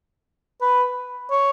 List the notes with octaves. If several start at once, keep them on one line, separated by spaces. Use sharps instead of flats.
B4
C#5